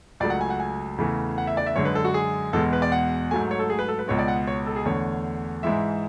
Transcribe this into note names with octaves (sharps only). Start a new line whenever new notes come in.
C#2 C#3 F#3 A3 D5
F#5
G#5
F#5
G#5
E2 C#3 E3 A3
F#5
E5
D5
E5
F#2 D3 G#3 C#5
B4
A4
F#4
G#4
E2 B2 G#3 A4
B4
D5
F#5
G#2 F#3 A3 G#5
C#5
A4
G#4
B4
A4
B4
C#2 B2 G#3 C#5
D5
F#5
C#5
A4
G#4
E2 D3 A3 C#5
G#2 E3 G#3 E5